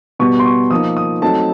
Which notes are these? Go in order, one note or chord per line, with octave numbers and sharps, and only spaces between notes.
B2 G3 B3 C#6
C6
C#6
F3 A#3 D#4 D#6
D#6
F#3 A3 C4 D#4 A5